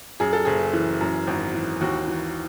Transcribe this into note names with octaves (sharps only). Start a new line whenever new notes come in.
F#2 G#4
A4
F#1 G#4
E3
F#2
G#1
E3
D#2 F#4
E3